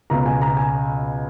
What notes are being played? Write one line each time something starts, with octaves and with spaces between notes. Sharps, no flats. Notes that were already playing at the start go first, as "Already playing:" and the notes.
C#2 B2 A#5
G#5
A#5
G#5